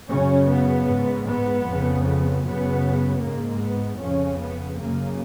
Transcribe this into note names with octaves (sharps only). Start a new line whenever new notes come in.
F#2 C#3 C#4
B3
G#2
B3
F2 C#3
B3
F#2 C#3 B3
G#2 A#3
B3
F2 C#3 C#4
B3
F#2 C#3 A#3